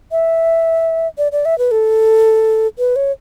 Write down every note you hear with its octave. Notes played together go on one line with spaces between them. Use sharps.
E5
D5
D5
E5
B4
A4
B4
C#5